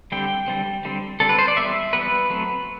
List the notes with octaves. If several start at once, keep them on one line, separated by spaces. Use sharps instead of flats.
D3 G3 C4 G5
D3 G3 C4
D3 G3 C4
D3 G3 C4 A4
B4
C5
D5
E3 G3 B3 E5
E3 G3 B3 B4
F#3 A3 C4